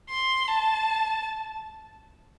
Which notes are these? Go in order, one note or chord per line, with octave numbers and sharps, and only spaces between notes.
C6
A5